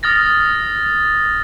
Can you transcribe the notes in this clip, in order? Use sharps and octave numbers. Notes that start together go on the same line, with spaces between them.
D#6 F6 A6 A#6